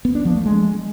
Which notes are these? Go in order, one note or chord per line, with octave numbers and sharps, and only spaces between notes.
B3
D4
F3
A3
G#3